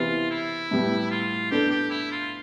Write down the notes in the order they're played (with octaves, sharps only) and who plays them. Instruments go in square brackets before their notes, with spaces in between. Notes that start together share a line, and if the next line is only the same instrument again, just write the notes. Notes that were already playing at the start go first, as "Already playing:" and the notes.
Already playing: [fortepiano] C3 E3 B3 [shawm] F4
[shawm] E4
[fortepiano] A2 G3 B3
[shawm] F4
[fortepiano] B3 D4 A4 [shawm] G4
[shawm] G4
E4
F4